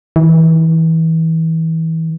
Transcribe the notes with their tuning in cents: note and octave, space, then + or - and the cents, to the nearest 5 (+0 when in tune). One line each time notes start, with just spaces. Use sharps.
E3 -30